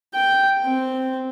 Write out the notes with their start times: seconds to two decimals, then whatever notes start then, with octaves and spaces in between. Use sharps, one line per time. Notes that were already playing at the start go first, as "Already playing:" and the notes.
0.15 G5
0.64 C4